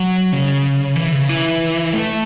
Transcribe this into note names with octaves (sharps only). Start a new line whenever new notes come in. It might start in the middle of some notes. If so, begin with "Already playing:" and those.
Already playing: F#3
C#3
E3
C#3
E3
A3